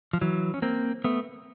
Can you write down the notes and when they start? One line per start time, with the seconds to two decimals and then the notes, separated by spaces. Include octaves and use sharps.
0.13 F3
0.21 E3 F#3
0.54 C#4
0.62 A#3 C4
1.04 A3 B3